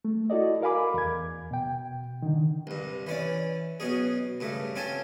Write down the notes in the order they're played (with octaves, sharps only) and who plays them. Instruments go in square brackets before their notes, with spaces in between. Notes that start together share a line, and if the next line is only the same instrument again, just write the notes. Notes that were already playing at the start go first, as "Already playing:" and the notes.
[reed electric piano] A3
E4 F#4 A4 D5 D#5
A#4 F5 G#5 B5 D6
E2 G#6
B2 G5
D3 D#3
[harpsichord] C2 G2
E3 C#4 D5
B2 F#3 C#4 G#4
G2 C#3 A3
C4 C#4 F4 G#5 A5